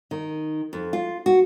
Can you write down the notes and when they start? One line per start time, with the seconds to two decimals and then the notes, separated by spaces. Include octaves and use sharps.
0.11 D#3
0.73 F2
0.93 F4
1.26 F#4